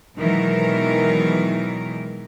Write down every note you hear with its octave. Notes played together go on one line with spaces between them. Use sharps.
B2 D#3 E3 F#3 G#3 A#4